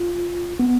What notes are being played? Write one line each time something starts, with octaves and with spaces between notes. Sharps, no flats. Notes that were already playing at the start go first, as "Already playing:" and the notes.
Already playing: F4
B3